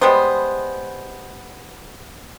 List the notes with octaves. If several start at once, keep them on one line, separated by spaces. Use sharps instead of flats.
G3 G#3 B3 C5